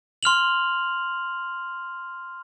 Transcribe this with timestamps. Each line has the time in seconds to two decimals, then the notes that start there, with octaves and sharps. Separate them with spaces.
0.23 C6 F6 F7 F#7